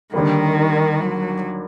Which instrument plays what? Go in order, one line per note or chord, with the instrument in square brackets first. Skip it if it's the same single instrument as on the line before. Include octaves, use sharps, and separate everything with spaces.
[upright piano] D#2 D3 G3 A#3 [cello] D#3
[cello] F#3